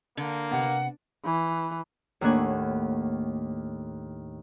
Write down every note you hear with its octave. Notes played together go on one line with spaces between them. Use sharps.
D3 A#3
C3 B3 F#5
E3
D#2 A2 A#3 D4 F#5 G#5